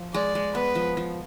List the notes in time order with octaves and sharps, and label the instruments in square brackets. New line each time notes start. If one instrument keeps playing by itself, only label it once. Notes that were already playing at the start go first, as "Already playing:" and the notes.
Already playing: [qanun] F3
[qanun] G#3 [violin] D5
[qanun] G#3
[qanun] B3 [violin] B4
[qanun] F3
F3